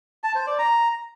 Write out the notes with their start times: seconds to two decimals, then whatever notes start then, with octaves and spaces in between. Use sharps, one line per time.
0.24 A5
0.35 C5
0.47 D5
0.59 A#5